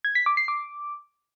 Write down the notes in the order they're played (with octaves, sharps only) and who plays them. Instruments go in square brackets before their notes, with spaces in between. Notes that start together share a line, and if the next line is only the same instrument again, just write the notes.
[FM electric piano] G#6
B6
D6
C7
D6